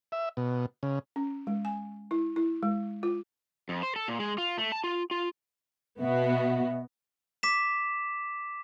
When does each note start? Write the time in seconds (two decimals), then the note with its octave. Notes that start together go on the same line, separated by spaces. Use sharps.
0.12 E5
0.37 B2
0.83 C#3
1.16 C#4
1.47 G#3
1.65 G#5
2.11 E4
2.36 E4
2.63 G#3
3.03 F4
3.69 F2
3.83 C5
3.96 A4
4.08 A#2
4.19 G#3
4.38 F4
4.58 A3
4.72 A5
4.84 F4
5.11 F4
5.99 B2 B3 F#4 E5
7.43 D6 B6 E7